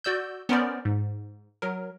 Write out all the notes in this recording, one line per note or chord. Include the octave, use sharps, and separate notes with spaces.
F#4 D5 E6 G6
B3 C#4 A#4 C5 D5
G#2
F#3 A#4